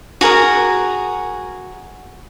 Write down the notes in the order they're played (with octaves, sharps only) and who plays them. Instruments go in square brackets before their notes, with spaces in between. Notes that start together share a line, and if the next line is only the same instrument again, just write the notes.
[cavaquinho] F#4 G#4 A#4 A#5